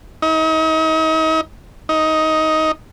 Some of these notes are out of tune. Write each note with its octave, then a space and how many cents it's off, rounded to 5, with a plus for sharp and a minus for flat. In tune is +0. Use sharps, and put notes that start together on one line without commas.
D#4 +40
D#4 +15